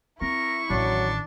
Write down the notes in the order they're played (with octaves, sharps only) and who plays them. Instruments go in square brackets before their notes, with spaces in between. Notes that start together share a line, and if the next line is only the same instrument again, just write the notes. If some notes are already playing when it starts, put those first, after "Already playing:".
[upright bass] C4 [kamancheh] E4 C#6 [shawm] A#4
[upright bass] A1 D#3 [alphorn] F#3 [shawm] D4